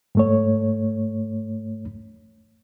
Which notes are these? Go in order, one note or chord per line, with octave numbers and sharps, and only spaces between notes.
G#2 A3 C#5